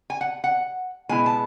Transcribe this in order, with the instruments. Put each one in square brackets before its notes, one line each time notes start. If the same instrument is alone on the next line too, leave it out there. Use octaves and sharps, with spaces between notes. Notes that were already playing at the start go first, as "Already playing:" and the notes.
[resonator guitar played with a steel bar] G#5
F#5
F#5
B2 G#3 B3 E4 G#5
A5